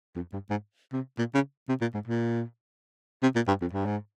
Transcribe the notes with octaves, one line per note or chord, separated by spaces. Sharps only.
F2
G2
G#2
C3
A#2
C#3
C3
A#2
G#2
A#2
C3
A#2
G2
F2
G2
G#2